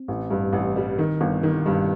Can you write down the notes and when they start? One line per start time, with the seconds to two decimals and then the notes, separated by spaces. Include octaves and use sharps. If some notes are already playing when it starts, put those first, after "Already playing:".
Already playing: C4
0.08 A1
0.31 G2
0.53 A1
0.76 G3
0.98 D#3
1.21 G1
1.43 D#3
1.66 G2